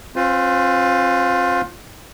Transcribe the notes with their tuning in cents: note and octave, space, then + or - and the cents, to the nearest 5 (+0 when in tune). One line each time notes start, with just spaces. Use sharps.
C4 +45 F4 +25 C5 -30